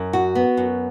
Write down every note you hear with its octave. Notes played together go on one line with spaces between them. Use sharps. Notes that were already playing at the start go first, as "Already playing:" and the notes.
Already playing: F#2
F#4
B3
F#2